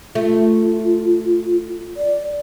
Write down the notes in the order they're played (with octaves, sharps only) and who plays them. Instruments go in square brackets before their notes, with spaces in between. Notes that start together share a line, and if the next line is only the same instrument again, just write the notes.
[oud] A3 [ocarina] F4
[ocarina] D5